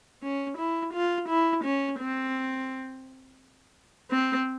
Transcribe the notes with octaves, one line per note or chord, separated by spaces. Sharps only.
C#4
E4
F4
E4
C#4
C4
C4